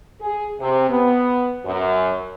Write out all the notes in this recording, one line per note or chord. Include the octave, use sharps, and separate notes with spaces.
G#4
C3
B3
F#2